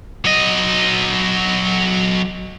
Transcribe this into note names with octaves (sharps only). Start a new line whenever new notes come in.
F#3 D#5